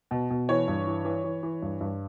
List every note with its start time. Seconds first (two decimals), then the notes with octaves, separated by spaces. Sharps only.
0.11 B2
0.30 B2
0.49 E3 C#5
0.68 G2
0.87 E3
1.05 E3
1.24 E3
1.43 E3
1.62 G2
1.81 G2